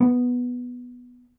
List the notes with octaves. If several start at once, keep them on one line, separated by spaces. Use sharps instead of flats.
B3